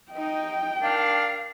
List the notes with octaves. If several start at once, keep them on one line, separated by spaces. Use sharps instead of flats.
D#4 D#5 G5
D4 A#4 F5